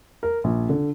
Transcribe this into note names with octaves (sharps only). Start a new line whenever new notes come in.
A#4
A#1
D3